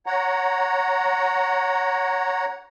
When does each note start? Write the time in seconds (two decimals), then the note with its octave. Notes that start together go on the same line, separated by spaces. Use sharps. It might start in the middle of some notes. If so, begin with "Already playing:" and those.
0.06 C#5 F#5 A#5